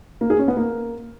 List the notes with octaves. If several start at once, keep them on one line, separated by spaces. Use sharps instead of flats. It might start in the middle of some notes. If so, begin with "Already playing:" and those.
A#3
G#4
C#4
B3
A#3